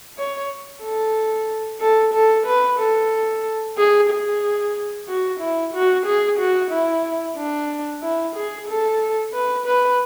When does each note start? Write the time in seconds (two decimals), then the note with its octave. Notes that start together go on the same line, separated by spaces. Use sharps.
0.18 C#5
0.84 A4
1.81 A4
2.14 A4
2.47 B4
2.79 A4
3.78 G#4
4.10 G#4
5.08 F#4
5.40 E4
5.74 F#4
6.06 G#4
6.39 F#4
6.71 E4
7.37 D4
8.03 E4
8.35 G#4
8.68 A4
9.34 B4
9.66 B4